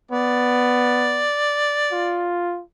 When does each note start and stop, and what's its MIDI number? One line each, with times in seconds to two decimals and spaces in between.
0.11 1.29 59
0.11 2.34 74
1.92 2.62 65